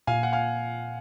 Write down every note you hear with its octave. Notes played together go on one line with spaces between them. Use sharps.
A#2 F5 G#5
F#5
F5 G#5